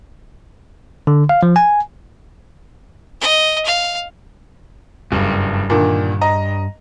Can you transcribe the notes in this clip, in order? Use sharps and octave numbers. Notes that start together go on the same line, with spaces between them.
D3
F5
F3
G#5
D#5
F5
F#1 G2
A#2 D3 D#3
D#5 A#5